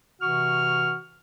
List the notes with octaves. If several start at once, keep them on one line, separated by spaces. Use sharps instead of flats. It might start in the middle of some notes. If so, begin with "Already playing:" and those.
C3 E3 F#4 C#6 F6